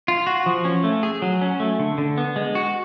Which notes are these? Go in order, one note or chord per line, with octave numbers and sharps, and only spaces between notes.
F4
F#4
F3
C#4
A3
G#4
F#3
C#4
A3
D3
D3
B3
G#3
F#4